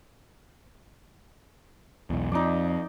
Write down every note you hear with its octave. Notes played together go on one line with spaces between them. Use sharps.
B1 E2
F2 D#4 D5